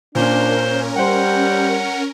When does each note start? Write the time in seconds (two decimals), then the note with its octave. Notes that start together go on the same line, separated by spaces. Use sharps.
0.15 A#2 C#4 D4 A#4 C5
0.96 G3 C5 F#5 G5